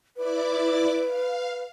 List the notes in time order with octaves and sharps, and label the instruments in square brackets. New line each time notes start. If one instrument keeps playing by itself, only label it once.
[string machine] E4 D5 D6 [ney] B4
[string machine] F5